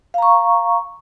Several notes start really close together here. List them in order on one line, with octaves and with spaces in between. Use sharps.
F5 A#5 C#6